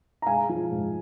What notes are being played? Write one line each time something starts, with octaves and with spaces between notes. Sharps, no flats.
A#5
G#3 F5 G#5
F3
G#2